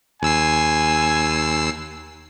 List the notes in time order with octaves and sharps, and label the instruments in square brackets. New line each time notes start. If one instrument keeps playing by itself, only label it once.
[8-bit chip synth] D#2 E6 C7 [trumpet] G#5